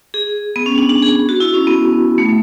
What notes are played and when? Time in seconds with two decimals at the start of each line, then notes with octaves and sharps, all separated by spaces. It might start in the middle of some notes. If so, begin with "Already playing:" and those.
0.14 G#4
0.56 B3
0.66 C#4
0.78 D4
0.89 D4
1.02 G#4
1.29 F#4
1.40 E4
1.54 C#4
1.67 B3
2.18 A3